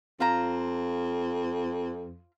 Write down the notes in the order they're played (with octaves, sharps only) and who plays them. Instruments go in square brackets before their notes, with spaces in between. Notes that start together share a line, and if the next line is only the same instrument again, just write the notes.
[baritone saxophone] F2 [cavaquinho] F4 C5 A#5